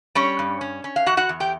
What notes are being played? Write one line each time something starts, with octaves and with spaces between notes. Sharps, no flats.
G3 C#4 C#5
G2
C#4
C#4
F5
E2 F#4 F#5
F#4 F#5
E2
G4 G5